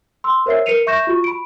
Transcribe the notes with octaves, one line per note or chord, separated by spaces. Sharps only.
C6 E6
A#4 C5 C#5 E5 E6 C7
A#4 B4 C7 C#7 D#7 F7
E5 C#6 G6 A#6 E7
F4 F#4 C#6
B5 D7